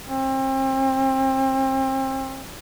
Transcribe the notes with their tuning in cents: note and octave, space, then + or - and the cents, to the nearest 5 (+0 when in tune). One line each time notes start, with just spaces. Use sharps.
C4 +35